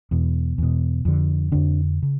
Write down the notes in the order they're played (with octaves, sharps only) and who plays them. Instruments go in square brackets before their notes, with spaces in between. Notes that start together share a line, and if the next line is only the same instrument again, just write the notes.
[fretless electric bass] E2 B2
E2 B2
F2 D3
F2 D3 D4
C#3